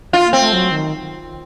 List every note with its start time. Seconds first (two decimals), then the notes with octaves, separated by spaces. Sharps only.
0.13 F4
0.26 A#3
0.33 C4
0.40 A3
0.53 F#3
0.72 D#3